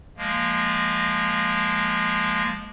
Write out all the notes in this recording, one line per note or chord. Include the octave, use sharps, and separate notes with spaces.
F3 G#3 A#3